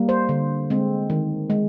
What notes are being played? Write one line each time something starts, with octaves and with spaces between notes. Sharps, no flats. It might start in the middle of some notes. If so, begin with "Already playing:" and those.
Already playing: G3 A#3
C5
D3
G#3 C4
D#3
G#3